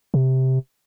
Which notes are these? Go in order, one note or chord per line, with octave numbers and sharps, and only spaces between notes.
C3